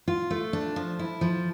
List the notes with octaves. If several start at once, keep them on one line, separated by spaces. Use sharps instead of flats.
F4
A3
D4
F3
E4
F3